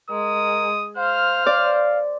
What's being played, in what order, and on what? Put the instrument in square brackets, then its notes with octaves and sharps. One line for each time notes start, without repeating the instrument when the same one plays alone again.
[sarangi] G#3 [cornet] A#4 [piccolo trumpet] D#6
[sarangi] C5 [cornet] F5 [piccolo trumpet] F6
[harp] D5 [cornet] F5